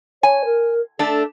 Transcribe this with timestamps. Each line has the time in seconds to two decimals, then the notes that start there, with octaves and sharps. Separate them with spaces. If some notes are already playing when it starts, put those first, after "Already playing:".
0.23 C#5 G#5
0.45 A#4
0.99 A3 D4 A4